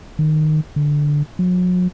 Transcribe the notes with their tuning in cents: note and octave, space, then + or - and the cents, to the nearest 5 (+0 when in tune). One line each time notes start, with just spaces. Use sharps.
D#3 -15
D3 +0
F#3 -40